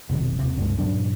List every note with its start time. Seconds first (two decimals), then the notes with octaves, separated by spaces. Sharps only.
0.09 F1 B1 C3 D#3
0.39 D#2 C3
0.56 C#2 G2 G#3
0.79 G2 A#2 F#3 D4